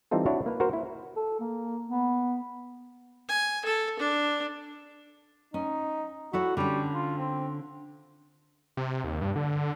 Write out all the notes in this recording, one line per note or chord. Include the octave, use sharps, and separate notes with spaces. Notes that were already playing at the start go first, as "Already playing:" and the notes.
E3 G3 C4 D#4 F4 A4
D4 E4 F#4 C#5
A#3 B4
F#4 A#4 C5
E4
A4
A#3
B3
G#5
A4
D4
C#4 D#4
E4 F#4 A4 C#5
D3 G3 C#4
F4
C4
C3
D#2
G2
D3